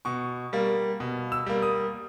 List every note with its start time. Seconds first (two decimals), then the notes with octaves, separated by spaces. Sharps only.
0.05 B2 C#6
0.53 G3 A#3
1.00 B2
1.32 E6
1.46 G3 A#3
1.62 D#6